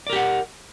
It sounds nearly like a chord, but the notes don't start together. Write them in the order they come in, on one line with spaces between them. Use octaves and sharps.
D5 A#4 G4 F#5